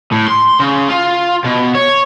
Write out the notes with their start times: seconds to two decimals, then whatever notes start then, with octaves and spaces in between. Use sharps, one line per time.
0.12 A2
0.28 C6
0.60 C#3
0.89 F4
1.44 B2
1.75 C#5